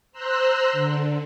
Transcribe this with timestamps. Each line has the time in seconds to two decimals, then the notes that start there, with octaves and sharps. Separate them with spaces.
0.12 C5 A#5 C6 E6 F#6
0.72 D3